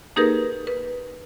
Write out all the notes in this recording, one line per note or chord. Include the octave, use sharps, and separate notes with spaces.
A#3 D#4 G4 G#4 A#4 B4
B4